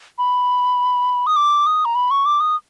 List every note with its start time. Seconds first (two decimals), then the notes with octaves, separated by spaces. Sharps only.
0.18 B5
1.27 D#6
1.36 D6
1.67 D#6
1.85 A#5
1.95 B5
2.11 C#6
2.26 D6
2.40 D#6